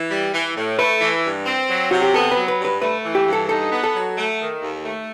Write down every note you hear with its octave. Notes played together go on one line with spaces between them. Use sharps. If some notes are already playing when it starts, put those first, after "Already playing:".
Already playing: E3
G3
E3
A2
A3 B4
E3
G2
C4
F#3
C3 F#4
G4
B3 A4
B4
F#3
B4
G2
B4
A3 B4
E3
G4
G2
A4
D#4 A4
B3
A4
F#3
A3
D#3
D#2
A3